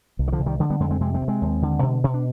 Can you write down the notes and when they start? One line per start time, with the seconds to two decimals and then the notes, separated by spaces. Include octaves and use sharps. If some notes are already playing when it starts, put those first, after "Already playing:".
0.19 C2
0.28 D#3
0.32 D3 F3
0.39 C2
0.46 D#3 G3
0.60 D3 F3 G#3
0.70 G3 B3
0.80 F2 G#3 C4
0.90 G#3 C4
1.01 C3 G#3 C4
1.14 G#3 C4
1.21 D2
1.28 G#3 C4
1.42 D#2
1.62 D3
1.83 B2
2.04 B2
2.14 D4